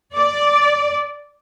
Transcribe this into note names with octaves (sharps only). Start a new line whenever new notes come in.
D5